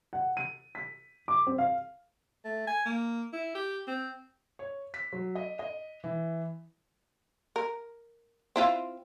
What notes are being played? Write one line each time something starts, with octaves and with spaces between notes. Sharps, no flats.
F#5
D#7
B6
D6
C4
F5
A3
G#5
A#3
E4
G4
C4
C#5
B6
F#3
D#5
D#5
E3
A#4
C4 E4 F4